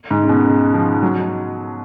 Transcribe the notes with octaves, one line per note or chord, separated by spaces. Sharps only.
G#2
C#3
B2
C#3
F3
F#3